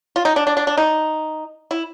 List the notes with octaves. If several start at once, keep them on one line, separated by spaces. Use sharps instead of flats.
F4
D#4
D4
D4
D4
D4
D#4
E4